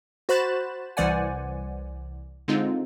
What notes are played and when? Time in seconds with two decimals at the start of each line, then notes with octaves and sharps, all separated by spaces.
0.29 F#4 C5 B5 F#6 A6 E7
0.97 C2 E3 C5 D5 F#5 G#5
2.48 D3 G#3 C4 D#4 F4